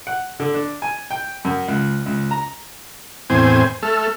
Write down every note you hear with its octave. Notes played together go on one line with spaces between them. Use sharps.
F#5
D3
D4
G#5
G5
F#2
C#2
C#2
A#5
E2 A2 C4 C5 G#5
A3 A4 F6